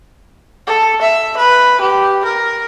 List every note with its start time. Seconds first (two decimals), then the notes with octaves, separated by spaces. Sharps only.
0.67 A4
1.02 E5
1.37 B4
1.81 G4
2.25 A#4